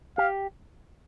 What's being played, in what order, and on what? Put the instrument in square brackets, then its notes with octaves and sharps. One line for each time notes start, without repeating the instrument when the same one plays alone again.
[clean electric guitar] G4 [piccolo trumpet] F5